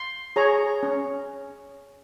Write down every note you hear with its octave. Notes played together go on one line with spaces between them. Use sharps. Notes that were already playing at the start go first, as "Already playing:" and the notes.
Already playing: C6
G#4 C#5 A#5
C#4